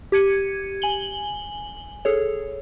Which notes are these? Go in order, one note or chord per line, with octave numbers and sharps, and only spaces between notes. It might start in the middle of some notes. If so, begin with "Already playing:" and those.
G4 G#6 C#7 D#7
G#5 F#7 G7
G#4 A4 C#5